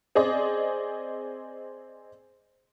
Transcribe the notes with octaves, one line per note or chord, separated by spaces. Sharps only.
C4 G#4 D5 D#5